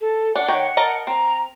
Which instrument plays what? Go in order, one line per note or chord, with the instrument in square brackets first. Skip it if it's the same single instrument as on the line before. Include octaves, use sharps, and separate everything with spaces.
[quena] A4
[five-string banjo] D4 [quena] F#5
[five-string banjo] D#3 C#5 G5
A#4 D#5 A5
[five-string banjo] C4 [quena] A#5